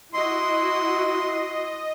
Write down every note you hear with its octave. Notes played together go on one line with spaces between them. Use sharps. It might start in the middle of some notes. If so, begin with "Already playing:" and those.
E4 F#4 D#5 C6